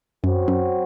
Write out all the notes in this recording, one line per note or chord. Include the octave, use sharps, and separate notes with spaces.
F#2 F#3 C4 F#4
F#2